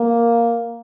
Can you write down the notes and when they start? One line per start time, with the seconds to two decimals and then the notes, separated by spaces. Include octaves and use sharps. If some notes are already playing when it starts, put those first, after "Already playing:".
Already playing: A#3